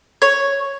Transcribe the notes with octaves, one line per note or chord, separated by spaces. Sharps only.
C#5